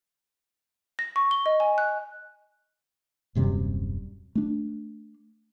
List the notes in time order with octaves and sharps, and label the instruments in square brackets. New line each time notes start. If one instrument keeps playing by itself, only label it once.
[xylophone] A#6
C#6
G7
D#5
G#5
F#6
[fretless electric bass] D#1 F#2 C3 G3
A3 D4